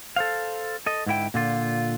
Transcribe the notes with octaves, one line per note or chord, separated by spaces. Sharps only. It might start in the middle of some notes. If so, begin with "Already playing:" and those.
A4 C5 F5
A4 D#5
G#2 D3 E4 G5
A#2 D3 F4